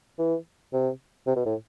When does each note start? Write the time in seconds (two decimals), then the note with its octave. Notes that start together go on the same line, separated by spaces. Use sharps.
0.19 E3
0.73 C3
1.27 C3
1.36 B2
1.46 A2